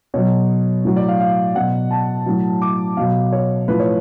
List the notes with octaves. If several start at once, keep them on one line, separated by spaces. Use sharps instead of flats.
B2 F#3 C#5
A2 F#3
D5
F5
F5
B2 F#3 F#5
A5
A2 F#3
D6
B2 F#3 F5
C#5
A2 F3 B4
C#5